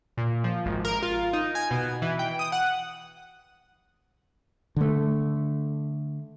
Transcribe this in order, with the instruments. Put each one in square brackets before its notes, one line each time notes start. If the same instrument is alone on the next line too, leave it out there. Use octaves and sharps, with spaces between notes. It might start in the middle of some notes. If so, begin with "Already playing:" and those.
[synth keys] A#2
F3
G#1
A#4
F4
D#4
G#5
B2
E3
G5
D#6
F#5
[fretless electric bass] D3 A3